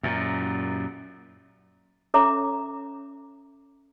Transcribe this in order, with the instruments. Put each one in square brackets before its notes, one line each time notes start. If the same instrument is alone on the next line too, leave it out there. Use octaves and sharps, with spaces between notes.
[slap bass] F#2 A#2
[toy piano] C#4 A4 C#5 E5 A#5 D6